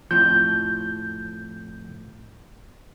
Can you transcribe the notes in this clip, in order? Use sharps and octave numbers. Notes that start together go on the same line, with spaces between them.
F2 A2 F3 G6